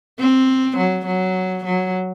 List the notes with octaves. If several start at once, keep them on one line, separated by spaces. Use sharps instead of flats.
C4
F#3
F#3
F#3